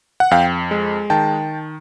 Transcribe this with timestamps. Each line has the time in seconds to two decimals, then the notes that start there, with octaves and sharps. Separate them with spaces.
0.20 F#5
0.31 F2 F5 G5
0.71 G#3
1.10 D#3 G5 A5